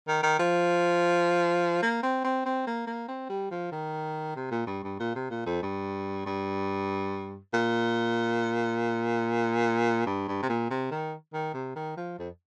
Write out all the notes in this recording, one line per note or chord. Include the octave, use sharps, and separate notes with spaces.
D#3
D#3
F3
A#3
C4
C4
C4
A#3
A#3
C4
G3
F3
D#3
C3
A#2
G2
G2
A#2
C3
A#2
F2
G2
G2
A#2
G2
G2
C3
A#2
C3
D#3
D#3
C3
D#3
F3
F2